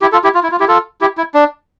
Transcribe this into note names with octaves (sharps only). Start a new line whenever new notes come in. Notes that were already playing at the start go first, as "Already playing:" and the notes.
E4 G4
F4 A4
E4 G4
F4
E4
F4
E4 G4
F4 A4
E4 G4
E4
D4